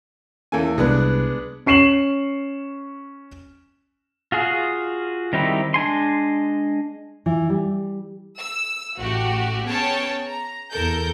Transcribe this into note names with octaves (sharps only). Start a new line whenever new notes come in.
E2 A#3 C#4 A4 G#5
C2 G#3 B3 D4 B4
C#4 C#6 C7 E7 F#7
F4 F#4 G#4 F5
D#3 G3 C4 D#4 E4
G#3 D4 G#5 C6
E3
G3
E6
A1 A3 F#4 G4
B3 C#4 G#4 C#5 G5 A5
A#5
E2 A4 A#4 G6